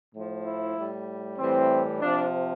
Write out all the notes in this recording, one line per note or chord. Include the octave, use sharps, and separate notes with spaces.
A2 F3
E4
A2 G3
A2 E3 G3 C4
C3 F3 D4